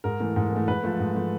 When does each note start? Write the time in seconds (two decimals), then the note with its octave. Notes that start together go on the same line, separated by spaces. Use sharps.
0.04 G#2 A#4
0.20 E3 A3
0.36 G#2
0.52 E3 A3
0.68 G#2 B4
0.83 F3 A3
1.00 G#2
1.16 F3 A3